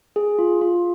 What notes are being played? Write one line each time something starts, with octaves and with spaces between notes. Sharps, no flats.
G#4
F4
F4